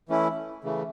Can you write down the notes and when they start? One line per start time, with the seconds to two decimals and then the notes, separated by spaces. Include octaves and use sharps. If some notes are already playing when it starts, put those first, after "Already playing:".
0.09 E3 A3 C#4 E4
0.64 C#3 E3 A3